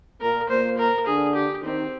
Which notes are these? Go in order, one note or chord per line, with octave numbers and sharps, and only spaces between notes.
A#2 A#3 A#4
A#2 A#3 C5
A#4
D3 D4 G#4
G4
D#3 C4 D#4